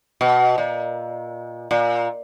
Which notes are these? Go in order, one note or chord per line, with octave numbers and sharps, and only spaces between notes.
B2
A#2
A#2